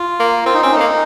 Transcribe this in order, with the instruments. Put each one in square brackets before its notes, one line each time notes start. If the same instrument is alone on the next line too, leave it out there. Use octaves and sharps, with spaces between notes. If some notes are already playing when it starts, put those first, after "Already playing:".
Already playing: [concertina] F4
[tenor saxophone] A#3
[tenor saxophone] C4 [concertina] F4
[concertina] D#4
[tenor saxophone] C4 [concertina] C#4
[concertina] D#4
[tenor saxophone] A3
A#3